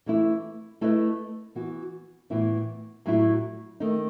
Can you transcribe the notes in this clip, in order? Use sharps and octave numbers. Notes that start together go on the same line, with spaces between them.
E3 A3 E4
A3 E4 B4 D#5
E3 B3 F#4
A2 E3 B3 E4
A2 F#3 A3 E4
D#3 A3 D#4